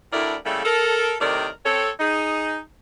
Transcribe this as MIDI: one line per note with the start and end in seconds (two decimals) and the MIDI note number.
0.12 0.35 38
0.12 0.35 45
0.12 0.35 64
0.12 0.35 70
0.12 0.35 74
0.45 0.62 49
0.45 0.62 55
0.45 0.62 57
0.45 0.62 58
0.45 0.62 64
0.45 0.62 69
0.64 1.14 69
0.64 1.14 70
1.20 1.48 45
1.20 1.48 48
1.20 1.48 51
1.20 1.48 70
1.20 1.48 74
1.65 1.90 60
1.65 1.90 69
1.65 1.90 73
1.99 2.58 63
1.99 2.58 68